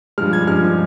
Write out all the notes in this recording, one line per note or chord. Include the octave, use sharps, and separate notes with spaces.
G2 F3 G#3 F6
G#6
G2 F3 G#3 F6